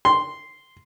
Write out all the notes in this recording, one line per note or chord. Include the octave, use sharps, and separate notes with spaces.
C6